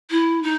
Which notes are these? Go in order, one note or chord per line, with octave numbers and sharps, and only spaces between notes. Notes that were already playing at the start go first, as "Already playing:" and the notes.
E4
D#4